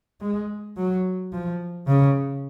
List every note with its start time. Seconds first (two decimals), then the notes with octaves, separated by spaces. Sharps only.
0.21 G#3
0.77 F#3
1.32 F3
1.87 C#3